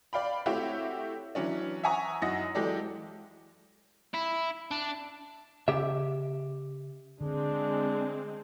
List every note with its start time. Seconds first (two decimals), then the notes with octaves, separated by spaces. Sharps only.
0.13 D5 F5 G5 B5
0.46 A3 C4 E4 F#4 G4 C#5
1.35 E3 F#3 C#4 D4
1.84 E5 F#5 G#5 A#5 C#6 D#6
2.22 F#2 D#4 E4 F#5 D#6 A#6
2.55 E3 F#3 G#3 G4 A4 D5
4.14 E4
4.71 D4
5.68 C#3 G4 E5
7.21 D3 G#3 C4 D4